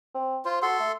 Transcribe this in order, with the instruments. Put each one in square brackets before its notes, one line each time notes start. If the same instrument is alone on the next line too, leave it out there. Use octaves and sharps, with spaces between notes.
[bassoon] C4
[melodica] F4 [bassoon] C5
[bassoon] F#4 [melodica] A4 C6
[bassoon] A3